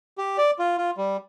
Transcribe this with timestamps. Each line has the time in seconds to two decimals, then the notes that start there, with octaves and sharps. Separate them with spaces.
0.18 G4
0.38 D5
0.59 F4
0.78 F4
0.97 G3